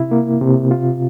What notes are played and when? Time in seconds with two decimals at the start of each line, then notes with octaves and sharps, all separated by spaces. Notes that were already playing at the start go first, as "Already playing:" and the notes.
Already playing: C3 E4
0.11 A#3
0.41 C3
0.71 F4